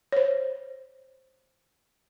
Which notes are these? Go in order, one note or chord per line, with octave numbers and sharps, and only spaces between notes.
C5 C#5